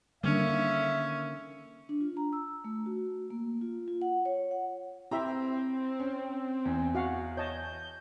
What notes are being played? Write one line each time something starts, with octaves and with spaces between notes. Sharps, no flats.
D3 D#3 G3 A#3 B3 C#4 D4 E5
D4
F4
A#5
E6
A3
F#4
A#3
F4
F4
F#5
C#5
F#5
C4 E4 G4 E5 A#5
C#4
E2
F#4 F5 F#5
C#5 D#5 A5 G6